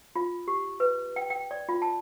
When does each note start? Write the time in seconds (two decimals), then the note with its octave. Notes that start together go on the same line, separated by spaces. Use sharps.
0.16 F4
0.48 G4
0.80 B4
1.16 G5
1.30 G5
1.51 D5
1.69 F4
1.82 A5